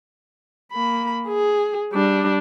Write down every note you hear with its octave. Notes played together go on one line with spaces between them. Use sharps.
A#3 B5
G#4
G3 D4